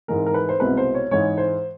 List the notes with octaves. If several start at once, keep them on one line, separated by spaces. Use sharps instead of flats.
G#2 E3 G#3 A#4
A#4
B4
C5
C2 B2 G#3 B4
C5
C#5
G#2 E3 G#3 C#5
C5